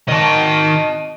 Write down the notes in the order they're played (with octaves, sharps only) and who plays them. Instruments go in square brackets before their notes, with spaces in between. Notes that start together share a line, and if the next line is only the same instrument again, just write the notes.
[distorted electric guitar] D#3 [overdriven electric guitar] D#5 A5